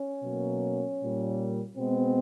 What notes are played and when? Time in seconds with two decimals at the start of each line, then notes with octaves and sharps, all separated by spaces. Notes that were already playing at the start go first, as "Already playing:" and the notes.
Already playing: C#4
0.22 B2 F#3 A#3
0.99 A#2 G3 A#3
1.77 B2 G#3 B3 C4